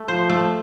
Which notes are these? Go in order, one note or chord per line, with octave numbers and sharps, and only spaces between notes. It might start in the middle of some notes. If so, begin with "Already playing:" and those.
Already playing: A3
F3 C5
A3